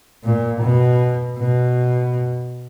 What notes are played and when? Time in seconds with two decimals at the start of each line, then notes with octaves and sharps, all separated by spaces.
0.24 A#2
0.62 B2
1.38 B2